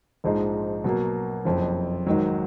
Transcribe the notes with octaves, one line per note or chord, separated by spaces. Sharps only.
A#1 G#2 F3 G#3 D#4
B2 F#3 A#3
F#1 F2 F3
G#1 G#2 D#3 F#3